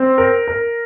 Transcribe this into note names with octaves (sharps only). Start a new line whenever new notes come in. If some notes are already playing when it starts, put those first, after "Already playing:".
Already playing: C4
A#4
A#4